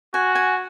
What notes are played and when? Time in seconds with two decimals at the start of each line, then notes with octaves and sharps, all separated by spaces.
0.14 F#4 G#5
0.35 G#5